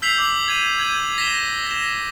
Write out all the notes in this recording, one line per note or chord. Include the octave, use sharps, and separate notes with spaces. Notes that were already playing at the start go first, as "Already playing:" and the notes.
E6 G6 B6 C7 F7 F#7
D6 F#7
G#6 D#7
G6 G#6 D#7 F#7
A#6 B6 E7 G7
A#6 E7